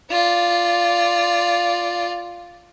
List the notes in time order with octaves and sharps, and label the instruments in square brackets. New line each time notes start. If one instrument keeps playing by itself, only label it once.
[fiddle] F4 D5